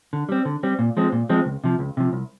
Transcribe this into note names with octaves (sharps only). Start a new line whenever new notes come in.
D3
G3 C4
D3
G3 C4
A#2
F3 G#3 C4
A#2
F3 G#3 C4
C#2
C3 F3
C#2
C3 F3
C2